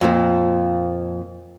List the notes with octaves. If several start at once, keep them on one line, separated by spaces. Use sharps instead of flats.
F2 A#2 F3